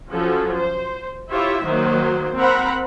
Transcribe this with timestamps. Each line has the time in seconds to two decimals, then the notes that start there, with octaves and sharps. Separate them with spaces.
0.11 F3 F#3 C#4 A4
0.57 C5
1.31 E4 F4 G4 C#5 E5
1.65 D#3 F#3 A#3 C5
2.37 C4 A#4 F#5 A#5 B5